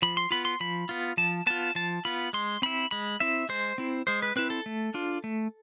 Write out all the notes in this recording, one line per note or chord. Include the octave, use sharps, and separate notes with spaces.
F3 B5
C6
B3 F4 B5
C6
F3 B5
B3 F4
F3 A5
B3 F4 A5
F3 A5
B3 F4 B5
G#3 C6
C4 E4 B5
G#3 B5
C4 E4 E5
G#3 C5
C4 E4
G#3 C5
B4
C4 E4 B4
A4
A3
D4 F4
A3